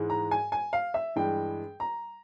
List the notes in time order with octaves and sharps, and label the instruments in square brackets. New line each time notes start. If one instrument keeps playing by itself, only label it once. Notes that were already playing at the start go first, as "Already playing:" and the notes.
Already playing: [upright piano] G#2 E3 G#3
A#5
G#5
G#5
F5
E5
G2 E3 G#3 G5
A#5